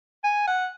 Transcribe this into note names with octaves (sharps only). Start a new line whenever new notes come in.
G#5
F#5